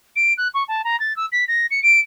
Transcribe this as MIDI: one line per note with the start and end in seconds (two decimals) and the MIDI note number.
0.16 0.33 98
0.38 0.48 90
0.54 0.63 85
0.68 0.82 81
0.84 0.99 82
1.00 1.16 93
1.16 1.26 88
1.32 1.44 95
1.48 1.66 94
1.71 1.80 97
1.83 2.00 98